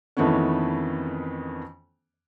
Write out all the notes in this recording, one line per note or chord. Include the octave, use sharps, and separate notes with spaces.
F2 D#3 E3 A3 B3 C#4